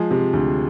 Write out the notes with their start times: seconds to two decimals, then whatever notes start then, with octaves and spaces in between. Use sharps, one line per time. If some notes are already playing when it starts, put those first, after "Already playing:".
Already playing: F3 G#3 G#4
0.11 C3
0.33 D2